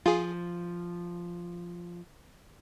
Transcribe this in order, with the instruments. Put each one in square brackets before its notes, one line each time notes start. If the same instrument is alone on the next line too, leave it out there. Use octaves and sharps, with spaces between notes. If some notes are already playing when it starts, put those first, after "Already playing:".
[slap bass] F3 [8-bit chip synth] F4 G#4